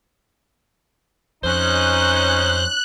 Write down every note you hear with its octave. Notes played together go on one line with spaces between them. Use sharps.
F2 C#4 D#4 C5 F#6